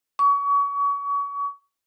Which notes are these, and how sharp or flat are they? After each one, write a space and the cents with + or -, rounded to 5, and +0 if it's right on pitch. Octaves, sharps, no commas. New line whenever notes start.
C#6 +35